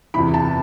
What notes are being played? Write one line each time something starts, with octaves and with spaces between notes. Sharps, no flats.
E2 C3 E3 B5
A5